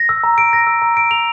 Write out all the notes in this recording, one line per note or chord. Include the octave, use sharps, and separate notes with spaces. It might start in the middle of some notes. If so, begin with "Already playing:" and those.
Already playing: A#6
E6
A#5
D7
A#6
E6
A#5
D7
F7